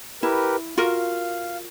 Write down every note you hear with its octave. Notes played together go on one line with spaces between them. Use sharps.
E4 G4 A#4 B4
F4 F#4 A#4 F5